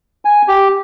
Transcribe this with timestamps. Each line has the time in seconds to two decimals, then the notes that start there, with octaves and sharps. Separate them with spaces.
0.25 G#5
0.48 G4